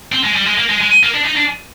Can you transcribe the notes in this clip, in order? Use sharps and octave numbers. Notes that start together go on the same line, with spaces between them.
C4
G#3
G3
G#3
A#3
G#3
G#3
A#3
D4
D#4
D4